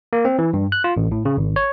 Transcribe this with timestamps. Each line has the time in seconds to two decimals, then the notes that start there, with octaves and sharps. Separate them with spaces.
0.13 A#3
0.25 C4
0.39 E3
0.53 G2
0.72 F#6
0.84 F4
0.97 A1
1.12 A2
1.25 C#3
1.37 G#1
1.56 C#5